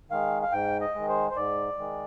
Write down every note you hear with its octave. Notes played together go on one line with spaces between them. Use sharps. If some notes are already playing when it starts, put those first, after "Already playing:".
D#3 G#3 F5
F5
G#2 G5
D#5
D#3 G#3
C5
C5
G#2 D5
D#3 G#3